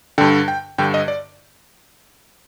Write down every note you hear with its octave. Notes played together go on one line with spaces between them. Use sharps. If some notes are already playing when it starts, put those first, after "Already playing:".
G2 D3 G5
G5
G2 D3 G5
D#5
D5